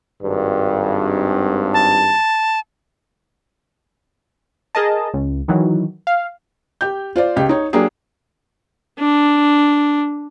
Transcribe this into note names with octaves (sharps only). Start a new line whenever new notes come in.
G#1 G2
A5
G#4 A#4 D#5 A5
C#2
D#3 E3 F#3
F5
G4 G6
F4 C5 D5
C#2 G4
D#4 C#5
F#3 A#3 D4 G4 G#4
D4